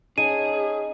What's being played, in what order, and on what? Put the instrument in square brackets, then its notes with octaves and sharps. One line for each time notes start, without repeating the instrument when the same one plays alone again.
[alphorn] C#4 [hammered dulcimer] D#4 A5 [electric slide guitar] G#4 [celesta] D#7